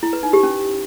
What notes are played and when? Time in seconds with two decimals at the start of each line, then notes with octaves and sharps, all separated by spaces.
0.03 E4
0.13 B4
0.23 D#4
0.33 G4
0.43 C#4